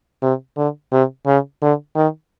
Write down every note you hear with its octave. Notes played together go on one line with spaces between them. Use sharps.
C3
D3
C3
C#3
D3
D#3